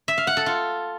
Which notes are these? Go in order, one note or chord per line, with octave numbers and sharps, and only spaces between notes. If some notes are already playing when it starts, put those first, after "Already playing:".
E5
F5
F#5
A4
F4